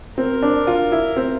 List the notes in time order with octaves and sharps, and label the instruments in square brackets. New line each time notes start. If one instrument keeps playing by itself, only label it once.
[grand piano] C4 [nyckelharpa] A#4
[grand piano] D4
F4
E4
C4